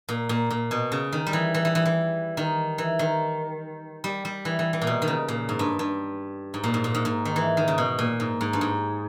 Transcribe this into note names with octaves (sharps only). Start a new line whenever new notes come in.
A#2
A#2
A#2
B2
C#3
D#3
G3
E3
E3
E3
E3
E3
D#3
E3
D#3
G3
G3
E3
E3
E3
A#2
B2
D#3
C#3
A#2
G#2
G2
G2
G#2
A#2
G#2
A#2
G#2
G#2
D#3
E3
D#3
C#3
B2
A#2
G#2
G#2
G2
G#2